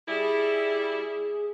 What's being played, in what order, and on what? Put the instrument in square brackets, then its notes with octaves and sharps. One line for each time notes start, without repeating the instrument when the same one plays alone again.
[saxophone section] G3 E4 [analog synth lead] G#4